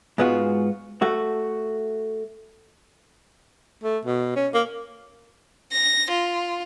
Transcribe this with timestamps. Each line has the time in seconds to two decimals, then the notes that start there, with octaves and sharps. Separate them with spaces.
0.18 G#2 G#3 B3 F4 F#4
1.02 A3 F#4
3.83 A3
4.05 B2
4.36 C#4
4.54 A#3
5.72 A#6
6.11 F4